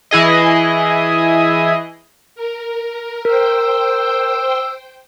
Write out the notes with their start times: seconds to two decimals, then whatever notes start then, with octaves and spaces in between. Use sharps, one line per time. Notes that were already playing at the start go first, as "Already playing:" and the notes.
0.11 E3 E4 G#4 D#5
2.35 A#4
3.25 A#4 C5 G5 E6